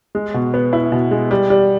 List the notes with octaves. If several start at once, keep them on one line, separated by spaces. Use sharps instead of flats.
G#3
B2
B3
E4
B2
G#3
G3
G3